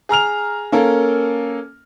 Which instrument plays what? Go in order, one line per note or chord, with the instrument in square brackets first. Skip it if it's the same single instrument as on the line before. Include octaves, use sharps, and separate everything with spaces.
[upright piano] G#4 A#5 F6 F7
A#3 C#4 A4 A#4